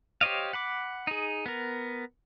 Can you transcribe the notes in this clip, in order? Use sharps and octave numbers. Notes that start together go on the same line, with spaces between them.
G4 C5 C#5 D#5 F5
F#5 B5 D6
D#4 G#4
B3 A#4